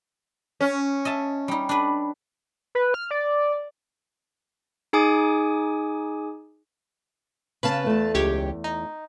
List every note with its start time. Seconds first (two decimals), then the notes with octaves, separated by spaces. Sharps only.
0.61 C#4
1.05 D#5 E5 A5
1.48 G3 D#4
1.69 D4 B4
2.75 B4
2.94 F6
3.11 D5
4.93 D#4 G#4 G#5 D6 D#6
7.63 C#3 B3 B4 F5 A5
7.86 E2 A3
8.14 C#2 G4 C#5
8.64 D#4